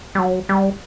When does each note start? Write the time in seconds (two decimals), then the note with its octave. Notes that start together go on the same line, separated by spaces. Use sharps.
0.15 G3
0.19 F#3
0.49 G3